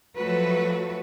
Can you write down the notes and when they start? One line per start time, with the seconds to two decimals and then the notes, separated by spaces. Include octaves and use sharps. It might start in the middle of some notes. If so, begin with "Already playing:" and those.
0.17 F3 F#3 A3 F#4 A4 B4